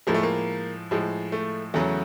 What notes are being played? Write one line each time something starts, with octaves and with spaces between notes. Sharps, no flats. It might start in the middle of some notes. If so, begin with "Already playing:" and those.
A2 F3 G#3 A#3
A3
A#3
A2 F3 G#3
A3
E2 C#3 F#3 A3